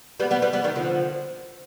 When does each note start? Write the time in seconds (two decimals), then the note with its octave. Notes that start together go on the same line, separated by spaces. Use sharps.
0.20 G3 B3
0.31 G3 B3
0.42 G3 B3
0.53 G3 B3
0.64 D#3 G3
0.76 D3 F3